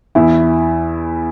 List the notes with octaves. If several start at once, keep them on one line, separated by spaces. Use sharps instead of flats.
E2 E4